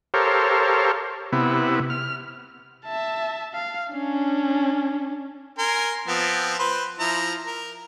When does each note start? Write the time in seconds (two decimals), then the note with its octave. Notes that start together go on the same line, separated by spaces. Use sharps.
0.14 G4 A4 A#4 C5 C#5 F5
1.33 C3 B3 E4
1.90 F6
2.85 E5 A5
3.54 F5
3.92 C#4 D4
5.58 A#4 G#5 C6
6.08 F3 B3 C4
6.59 B4 C5
6.99 F3 E4 A#5
7.46 A#4